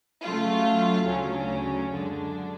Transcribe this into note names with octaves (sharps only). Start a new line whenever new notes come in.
C#3 F#3 A3 F4
D2 C#3 F#3 C#4
F#2 D3 G#3 D4